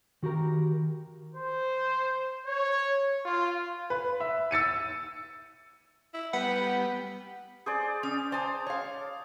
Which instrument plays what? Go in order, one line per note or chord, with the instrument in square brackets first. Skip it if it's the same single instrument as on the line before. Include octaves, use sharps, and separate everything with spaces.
[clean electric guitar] D#3 F#4 G4 A#4
[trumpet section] C5
C#5
F4
[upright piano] B4
E5
E6 A6 C#7 D#7
[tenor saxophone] E4
[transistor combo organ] G3 B3 [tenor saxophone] B4 [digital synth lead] F#5
[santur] G#4 C5 D5
[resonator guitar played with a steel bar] C#4 [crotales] D#6
[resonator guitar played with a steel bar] C5 G#5 [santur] A5
[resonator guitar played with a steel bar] C#5 F5